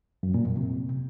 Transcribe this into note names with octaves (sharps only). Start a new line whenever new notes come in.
F#2
A#2
F2
C3